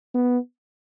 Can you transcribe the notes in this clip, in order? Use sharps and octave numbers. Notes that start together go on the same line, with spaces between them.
B3